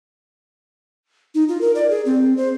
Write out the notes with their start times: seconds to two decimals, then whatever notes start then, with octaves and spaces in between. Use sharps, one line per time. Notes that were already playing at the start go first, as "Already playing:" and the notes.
1.35 D#4
1.49 F4
1.61 A#4
1.75 D5
1.90 G#4
2.06 C4
2.37 C5